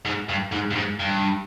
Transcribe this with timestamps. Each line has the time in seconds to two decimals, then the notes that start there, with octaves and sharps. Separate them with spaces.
0.05 G#2
0.29 G2
0.52 G#2
0.71 G2
0.75 G#2
0.99 G2